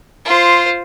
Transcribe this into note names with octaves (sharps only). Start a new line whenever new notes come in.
F4 C5